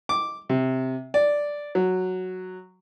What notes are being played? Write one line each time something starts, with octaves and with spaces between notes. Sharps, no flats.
D6
C3
D5
F#3